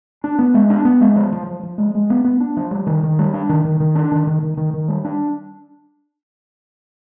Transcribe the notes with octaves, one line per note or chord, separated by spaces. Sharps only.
D4
B3
G#3
D4
B3
G#3
F3
F3
F3
F3
G#3
G#3
B3
B3
D4
F3
G3
D#3
D#3
G3
D4
D#3
D#3
D#3
D4
D#3
D#3
D#3
D#3
D#3
G3
D4